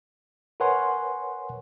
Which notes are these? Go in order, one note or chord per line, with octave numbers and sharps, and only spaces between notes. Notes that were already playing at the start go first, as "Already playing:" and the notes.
A#4 B4 C#5 F#5 G#5 C6